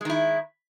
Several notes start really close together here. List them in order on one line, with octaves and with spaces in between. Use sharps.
G#3 D#3 E4